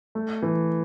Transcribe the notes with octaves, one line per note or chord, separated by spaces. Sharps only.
A3
E3